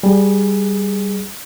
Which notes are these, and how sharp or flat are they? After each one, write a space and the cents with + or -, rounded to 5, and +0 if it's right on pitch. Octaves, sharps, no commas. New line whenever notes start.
G3 +0 G#4 +0